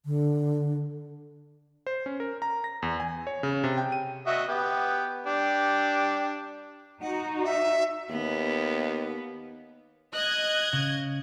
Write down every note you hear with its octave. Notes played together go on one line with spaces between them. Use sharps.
D3
C5
C#4
A#4
A#5
A#6
E2
G#5
C#5
C#3
C3
G5
D#7
F#4 D#5 E5
B3 G4
D4 G4
D#4 F#4 F#5
E5
D#2 B3
D#5 F#6 G#6
C#3